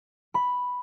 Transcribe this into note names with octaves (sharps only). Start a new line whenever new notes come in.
B5